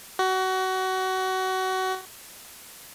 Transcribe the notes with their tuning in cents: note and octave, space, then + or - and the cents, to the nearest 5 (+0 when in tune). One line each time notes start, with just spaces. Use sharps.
F#4 +25